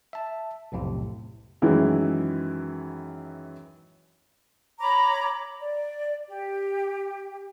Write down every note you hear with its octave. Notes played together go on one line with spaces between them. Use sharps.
E5 A5
B1 F2 A2 C3
F#2 D#3 E3 G#3 E4
C#5 A#5 B5 D6
D5
G4